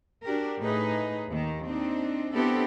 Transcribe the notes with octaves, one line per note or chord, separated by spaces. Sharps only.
D4 F#4 G4 A#4
A2 D#4 G#4 B4
D#2 D#3
C4 D4 D#4
B3 C4 D4 E4 G4 A4